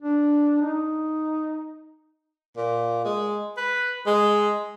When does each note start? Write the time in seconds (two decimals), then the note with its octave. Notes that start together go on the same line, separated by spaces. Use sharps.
0.02 D4
0.62 D#4
2.57 A#2
3.05 G#3
3.57 B4
4.06 G#3